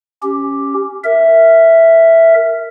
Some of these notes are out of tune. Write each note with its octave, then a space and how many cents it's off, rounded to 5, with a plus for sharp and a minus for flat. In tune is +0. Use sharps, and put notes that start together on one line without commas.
C#4 +0 G4 +0
A#4 -15 E5 +0